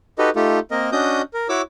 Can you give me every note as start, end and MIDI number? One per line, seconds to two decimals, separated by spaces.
0.19 0.30 63
0.19 0.30 66
0.19 0.30 67
0.19 0.30 69
0.19 0.30 71
0.19 0.30 75
0.36 0.59 57
0.36 0.59 63
0.36 0.59 65
0.36 0.59 67
0.36 0.59 69
0.71 0.90 58
0.71 0.90 60
0.71 0.90 70
0.71 0.90 75
0.92 1.22 61
0.92 1.22 62
0.92 1.22 66
0.92 1.22 75
0.92 1.22 87
0.92 1.22 91
1.34 1.48 70
1.49 1.62 64
1.49 1.62 66
1.49 1.62 73
1.49 1.62 86
1.49 1.62 88